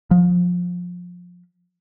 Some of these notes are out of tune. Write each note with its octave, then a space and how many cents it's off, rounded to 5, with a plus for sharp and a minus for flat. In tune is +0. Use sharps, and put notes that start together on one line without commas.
F3 +25